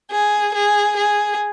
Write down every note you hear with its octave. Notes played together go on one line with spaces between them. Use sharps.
G#4
G#4
G#4